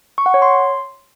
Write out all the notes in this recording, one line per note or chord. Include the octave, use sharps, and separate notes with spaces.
C#6
F#5
C#5
C6